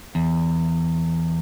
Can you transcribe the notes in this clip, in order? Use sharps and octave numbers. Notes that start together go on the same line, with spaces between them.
E2